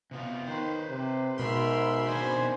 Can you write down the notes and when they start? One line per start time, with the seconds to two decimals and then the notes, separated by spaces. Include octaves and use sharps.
0.11 C3 B3 F4
0.47 D#3 B4 C5
0.89 C3
1.38 G#2 B2 A#4 E5 B5 C6
2.07 D#3 C4 D4 C5 G#5